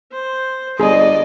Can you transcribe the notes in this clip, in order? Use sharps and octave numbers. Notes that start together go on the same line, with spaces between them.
C5
G1 G#4 D5 D#5